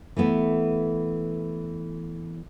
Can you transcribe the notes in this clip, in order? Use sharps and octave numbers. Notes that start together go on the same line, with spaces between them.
E3 A3 B3 E4